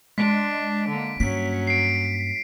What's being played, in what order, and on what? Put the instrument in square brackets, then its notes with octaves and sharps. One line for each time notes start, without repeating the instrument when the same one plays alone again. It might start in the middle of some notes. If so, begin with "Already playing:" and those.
[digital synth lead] G#3 [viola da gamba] D4 [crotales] B6 D7
[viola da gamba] D3 A#3
[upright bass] G2 A#3 [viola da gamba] F#3 C#4 [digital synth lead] B6
[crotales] C7 D7